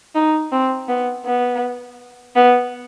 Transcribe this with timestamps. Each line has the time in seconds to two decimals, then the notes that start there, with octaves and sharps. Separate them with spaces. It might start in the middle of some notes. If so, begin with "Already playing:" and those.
0.15 D#4
0.52 C4
0.88 B3
1.25 B3
2.36 B3